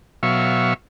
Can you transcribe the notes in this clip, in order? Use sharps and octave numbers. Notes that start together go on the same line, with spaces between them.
B2 F#3 E5 F5 C#6